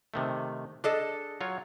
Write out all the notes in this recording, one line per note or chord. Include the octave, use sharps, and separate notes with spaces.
C3 D#3 A3
D4 G#4 A4 D#5
F#3 F4 C#5